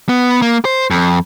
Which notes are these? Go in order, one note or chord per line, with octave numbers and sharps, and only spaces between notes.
B3
A#3
C5
F2